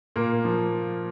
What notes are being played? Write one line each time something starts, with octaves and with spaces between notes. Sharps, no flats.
A#2 A#3
F3